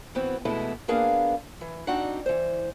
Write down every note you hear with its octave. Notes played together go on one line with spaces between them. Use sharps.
E3 B3 C4 F#4
B2 E3 G#3 A3 B3 E4
A#3 B3 D4 G#4 A#4 F5
E3
C4 D4 D#4 F#4 D5 F#5
E3 C5